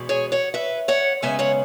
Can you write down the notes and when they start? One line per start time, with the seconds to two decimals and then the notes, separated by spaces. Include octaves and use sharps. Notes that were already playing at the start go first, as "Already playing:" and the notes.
Already playing: E2 B2 G#3 B3
0.09 G#4 C#5
0.32 C#5 F#5
0.54 B4 E5
0.88 C#5 F#5
1.22 F#2 C#3 G#3 B3 E5 G#5
1.39 C#5 F#5